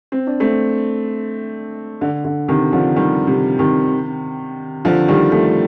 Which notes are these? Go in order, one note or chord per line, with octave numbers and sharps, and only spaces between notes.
C4
D4
A3 C4
D3
D3
C3 D#3
D3 F3
D#3 G3
C3
C3 D#3
D3 F3
D#3 G3
F3 A3